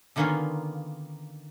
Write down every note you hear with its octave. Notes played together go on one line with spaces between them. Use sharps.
D3 D#3 A#3 B3 C#4 F4